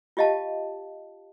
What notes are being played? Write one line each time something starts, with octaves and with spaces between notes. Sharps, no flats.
F4 G4 D#5 F5 A5